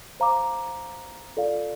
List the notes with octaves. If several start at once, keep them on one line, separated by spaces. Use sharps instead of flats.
C5 F5 A#5 D6
F4 A4 D5 F5